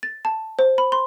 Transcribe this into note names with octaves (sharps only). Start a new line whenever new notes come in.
A6
A5
C5
B5
C6